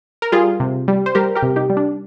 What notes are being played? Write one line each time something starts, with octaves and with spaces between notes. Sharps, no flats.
A#4
G3 F4 G#4
C3
G3
C5
G3 G4 A#4
G4 A#4
C3
D#4 G4
G3
D4